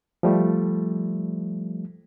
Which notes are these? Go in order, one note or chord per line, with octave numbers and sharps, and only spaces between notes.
F3 G3 A3